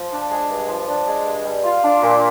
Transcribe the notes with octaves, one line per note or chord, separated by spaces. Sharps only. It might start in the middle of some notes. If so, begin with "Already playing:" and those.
Already playing: F3
D4
G#3
G2
F3
D4
G#3
G2
G3
F4
D4
A#2